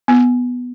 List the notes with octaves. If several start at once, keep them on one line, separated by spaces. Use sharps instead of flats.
B3